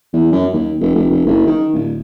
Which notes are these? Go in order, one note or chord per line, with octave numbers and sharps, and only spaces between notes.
E2
F#2
D#2
F1
F1
F1
F#1
D#3
D1